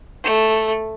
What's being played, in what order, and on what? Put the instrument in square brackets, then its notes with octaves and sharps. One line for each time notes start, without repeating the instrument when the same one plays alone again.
[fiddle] A3